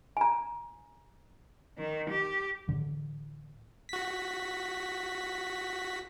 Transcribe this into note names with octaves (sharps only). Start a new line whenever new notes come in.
G#5 A#5
D#3
G4
A2 D3 E3
F#4 B6